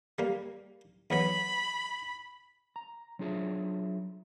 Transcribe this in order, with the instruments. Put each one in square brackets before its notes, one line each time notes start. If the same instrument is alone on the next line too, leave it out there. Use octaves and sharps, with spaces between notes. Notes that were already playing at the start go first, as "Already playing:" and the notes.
[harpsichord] G3 A#3
[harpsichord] E2 F#3 B3 [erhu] B5
[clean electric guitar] A#5
F#3 D4 F4 G#4 E5